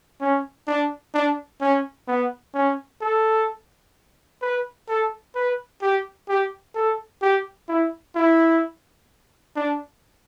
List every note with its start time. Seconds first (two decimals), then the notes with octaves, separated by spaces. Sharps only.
0.21 C#4
0.68 D4
1.14 D4
1.61 C#4
2.08 B3
2.54 C#4
3.01 A4
4.42 B4
4.88 A4
5.35 B4
5.82 G4
6.29 G4
6.75 A4
7.22 G4
7.68 E4
8.15 E4
9.56 D4